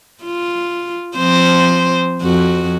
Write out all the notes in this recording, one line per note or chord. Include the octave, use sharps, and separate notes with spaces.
F4
F3 C4 C5
F2 F#4